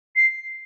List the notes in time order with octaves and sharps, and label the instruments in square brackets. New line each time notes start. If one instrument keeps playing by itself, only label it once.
[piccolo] C7